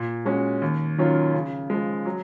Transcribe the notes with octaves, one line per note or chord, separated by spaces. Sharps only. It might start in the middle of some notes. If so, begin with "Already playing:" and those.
Already playing: A#2
G#3 C#4 F#4
D#2
D#3 F#3 C#4 F4
C#3
F3 G#3
F#3